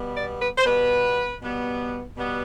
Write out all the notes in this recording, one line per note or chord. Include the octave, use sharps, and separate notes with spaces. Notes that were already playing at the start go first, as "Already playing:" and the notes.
Already playing: B2 G3 B3
D5
B4
C5
B2 G3 B3 B4
B2 G3 B3
B2 G3 B3